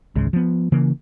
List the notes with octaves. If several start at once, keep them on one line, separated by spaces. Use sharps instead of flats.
G#1 C#2 C#3 G#3
F3 B3
C#3 E3 A#3